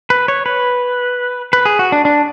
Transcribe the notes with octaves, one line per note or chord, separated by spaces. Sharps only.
B4
C#5
B4
B4
G#4
F#4
D4
D4